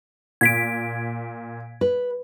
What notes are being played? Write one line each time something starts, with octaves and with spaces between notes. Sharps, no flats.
A#2 G#6 B6 D7
B4